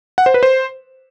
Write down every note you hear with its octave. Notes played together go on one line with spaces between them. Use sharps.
F#5
C5
B4
C5